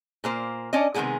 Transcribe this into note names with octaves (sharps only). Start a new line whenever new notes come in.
A#2 A#3 C5
C#4 D4 D5 D#5
C3 D#3 G#3 A#3 B3 G#4